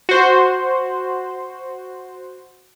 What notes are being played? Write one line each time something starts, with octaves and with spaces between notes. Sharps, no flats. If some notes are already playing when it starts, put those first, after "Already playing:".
F#4 C5